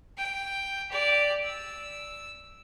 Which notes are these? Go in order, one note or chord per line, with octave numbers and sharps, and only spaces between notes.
G5
G4 D5
E6